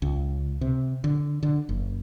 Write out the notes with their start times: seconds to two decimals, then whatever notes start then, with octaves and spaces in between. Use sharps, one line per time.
0.02 C#2
0.61 C3
1.04 D3
1.43 D3
1.69 F#1